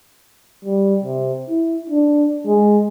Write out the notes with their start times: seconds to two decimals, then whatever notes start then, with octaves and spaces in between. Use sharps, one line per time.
0.65 G3
1.04 C3
1.49 E4
1.90 D4
2.47 G#3